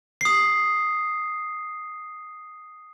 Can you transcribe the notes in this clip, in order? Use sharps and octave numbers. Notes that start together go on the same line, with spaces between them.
D#6 C7